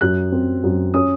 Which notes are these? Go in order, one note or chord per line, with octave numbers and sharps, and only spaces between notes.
F#2 F#6
C4
F#2
C#4 D#6